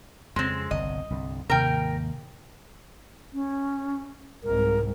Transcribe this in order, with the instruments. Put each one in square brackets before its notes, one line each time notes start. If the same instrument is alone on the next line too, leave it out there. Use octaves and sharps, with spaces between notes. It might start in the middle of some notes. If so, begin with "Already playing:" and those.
[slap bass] F2 C#3 [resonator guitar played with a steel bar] G#3 C4 [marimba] C6
[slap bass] G1 C2 [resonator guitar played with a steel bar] D#5
[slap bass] C2 G2 D3
[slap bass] D#2 G#2 [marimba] C3 [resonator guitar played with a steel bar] A#4 G5
[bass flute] C#4
[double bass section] C2 G#2 [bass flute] A#4